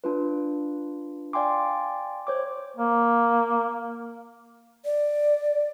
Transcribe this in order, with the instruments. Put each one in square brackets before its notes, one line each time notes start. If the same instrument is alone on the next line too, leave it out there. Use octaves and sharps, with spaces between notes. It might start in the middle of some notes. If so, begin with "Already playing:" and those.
[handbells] D4 F4 B4
D5 F5 G5 G#5 C6 D6
C5 C#5 D6
[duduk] A#3
[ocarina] D5